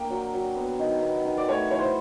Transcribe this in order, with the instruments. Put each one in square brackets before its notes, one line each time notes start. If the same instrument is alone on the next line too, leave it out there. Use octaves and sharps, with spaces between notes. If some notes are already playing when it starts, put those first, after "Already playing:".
Already playing: [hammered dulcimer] A#3 D4 [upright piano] G5
[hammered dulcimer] F#3
F#3
B3
D#3
B3
D#3
[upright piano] D5
[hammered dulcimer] A3 [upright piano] C#5
[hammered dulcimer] E4 [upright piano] C#5
[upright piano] C5